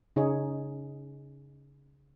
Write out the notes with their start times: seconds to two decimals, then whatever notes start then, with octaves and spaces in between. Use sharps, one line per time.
0.16 C#3 D#4 G#4 C#5